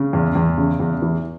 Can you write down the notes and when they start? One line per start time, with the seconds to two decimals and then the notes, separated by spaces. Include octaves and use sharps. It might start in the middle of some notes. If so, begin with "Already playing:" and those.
Already playing: C#3
0.13 E2
0.35 E2
0.58 C#3
0.80 E2
1.02 E3